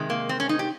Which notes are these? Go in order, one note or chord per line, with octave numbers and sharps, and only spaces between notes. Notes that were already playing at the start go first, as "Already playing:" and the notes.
Already playing: C3 D#3 G#3
A#3
C4
C#4
D#4
G4